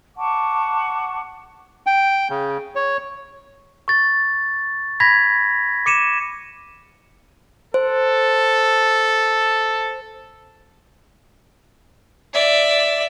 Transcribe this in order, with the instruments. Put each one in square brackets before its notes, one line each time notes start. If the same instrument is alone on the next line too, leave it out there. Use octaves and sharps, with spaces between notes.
[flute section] F#5 A5 C#6 D6
[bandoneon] G5
C#3
C#5
[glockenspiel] C#6 A6
B5 G#6 A#6 B6
D6 C#7 D#7 E7
[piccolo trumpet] A4 [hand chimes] C5
[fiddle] D5 E5